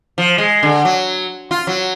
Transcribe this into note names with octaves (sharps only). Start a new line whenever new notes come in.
F3
G#3
D3
F#3
F4
F#3